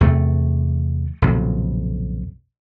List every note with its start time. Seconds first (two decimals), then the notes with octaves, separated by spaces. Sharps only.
0.01 E2 C3 A3
1.22 B1 F2 A#2 C#3